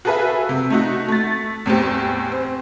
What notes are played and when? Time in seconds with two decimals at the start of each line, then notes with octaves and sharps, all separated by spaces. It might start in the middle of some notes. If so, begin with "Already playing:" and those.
0.05 F#4 G#4 A4 B4 E5 F5
0.49 C3
0.70 A3 D#4 F#4
1.08 A3 A6
1.66 E2 A2 C4 G4
2.32 C4